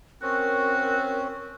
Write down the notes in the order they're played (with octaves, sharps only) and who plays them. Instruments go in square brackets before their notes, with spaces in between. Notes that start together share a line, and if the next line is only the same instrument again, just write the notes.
[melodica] C4 C#4 [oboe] F#4 [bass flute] A#4